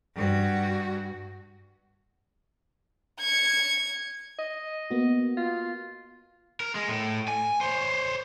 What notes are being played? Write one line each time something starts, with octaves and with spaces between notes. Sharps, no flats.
G2 F#4
G#6 C#7
D#5
A#3 B3 F#4
F4
A#4
G#3
A2
G#5
C5 C#5